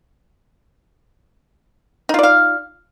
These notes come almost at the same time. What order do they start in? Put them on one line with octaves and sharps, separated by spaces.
D#4 F4 D5 F5